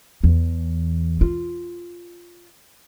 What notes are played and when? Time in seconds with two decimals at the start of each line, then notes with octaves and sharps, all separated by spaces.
0.24 E2
1.21 F4